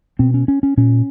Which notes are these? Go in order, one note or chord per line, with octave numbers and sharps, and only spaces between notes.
B2 C4
C#4
C#4
C#4
A#2 C#4